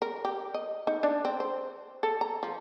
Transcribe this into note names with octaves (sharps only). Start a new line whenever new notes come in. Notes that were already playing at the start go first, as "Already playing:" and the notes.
A#4
G4
D#5
D#4
D4
C4
C5
A4
A#5
F3